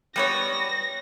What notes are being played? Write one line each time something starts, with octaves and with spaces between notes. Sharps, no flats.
G3 B3 C#5 A#6